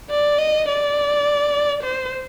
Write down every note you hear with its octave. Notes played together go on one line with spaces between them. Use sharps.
D5
D#5
D5
C5